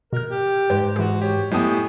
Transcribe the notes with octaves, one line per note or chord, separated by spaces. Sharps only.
B2 A#4 F6
G4
G#2 B4 C5
E3 F#4 G#4
G4 C#5
A2 F#3 B3 G4 D#5 G#5 A5 D#6